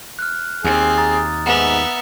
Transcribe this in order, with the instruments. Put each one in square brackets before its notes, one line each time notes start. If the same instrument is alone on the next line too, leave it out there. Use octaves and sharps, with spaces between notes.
[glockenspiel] F6 F#6
[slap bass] D#2 [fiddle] C4 [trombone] G#4
[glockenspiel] A#5 D#6 A6
[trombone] G#2 [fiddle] B3 E5